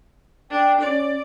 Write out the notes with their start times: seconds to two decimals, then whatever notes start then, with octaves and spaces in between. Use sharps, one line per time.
0.50 D4 G5
0.80 C#4 D5